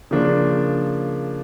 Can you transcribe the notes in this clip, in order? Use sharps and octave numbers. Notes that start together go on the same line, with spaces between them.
C#3 F3 A#3 D4